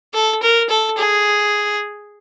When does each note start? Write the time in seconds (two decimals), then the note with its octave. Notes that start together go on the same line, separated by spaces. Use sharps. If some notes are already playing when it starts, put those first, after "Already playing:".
0.14 A4
0.42 A#4
0.69 A4
0.98 G#4